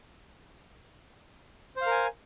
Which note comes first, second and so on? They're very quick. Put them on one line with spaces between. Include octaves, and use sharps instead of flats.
C5 F5 A#4 G#5